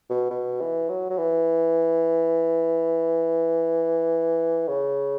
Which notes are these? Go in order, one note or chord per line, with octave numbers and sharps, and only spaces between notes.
B2
B2
E3
F#3
F#3
E3
C#3